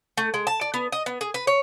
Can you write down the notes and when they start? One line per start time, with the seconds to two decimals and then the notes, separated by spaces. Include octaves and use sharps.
0.17 A3
0.34 G#3
0.47 A5
0.61 D5
0.74 B3
0.92 D#5
1.06 B3
1.21 G#4
1.34 B4
1.47 C#5